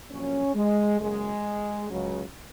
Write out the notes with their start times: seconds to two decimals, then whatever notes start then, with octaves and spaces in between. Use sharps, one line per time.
0.10 A#1 A#2 F#3 C#4
0.55 G#3
1.00 F#1 F#2 C#3 F#3 G#3
1.91 C#2 C#3 F#3